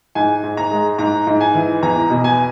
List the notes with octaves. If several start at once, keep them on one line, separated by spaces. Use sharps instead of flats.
G#2 G#5
G#2
A#5
G#3
G#2 A#5
G#2
G#5
E3
E2 A#5
B2
G#5